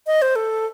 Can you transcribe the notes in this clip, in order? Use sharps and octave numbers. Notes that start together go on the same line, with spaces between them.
D#5
C5
A4